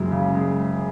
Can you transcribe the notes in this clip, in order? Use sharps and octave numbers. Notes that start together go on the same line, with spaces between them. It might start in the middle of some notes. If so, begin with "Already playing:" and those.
Already playing: F#1 F#2 G#3
C#3
G#3